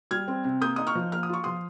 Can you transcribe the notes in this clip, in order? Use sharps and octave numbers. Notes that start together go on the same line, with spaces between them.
G3 F6 G#6
C4
C3
A#3 D#6 G6
D#4 D#6
C#6 F6
F3
A#3 F6
D#6
F4 C#6
F3 C6 D#6